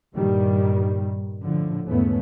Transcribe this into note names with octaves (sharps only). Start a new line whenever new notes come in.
G2 A#2 D#3 G3
A2 D3 F3
E2 G#2 A3 B3 C#4